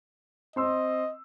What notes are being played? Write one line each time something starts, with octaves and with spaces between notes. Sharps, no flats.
C4 D#5 C6 E6